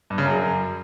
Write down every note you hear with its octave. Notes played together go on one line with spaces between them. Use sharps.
G2
C#3
F#2